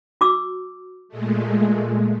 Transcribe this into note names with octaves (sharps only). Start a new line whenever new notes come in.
F#4 D6 E6
A#2 G#3 A3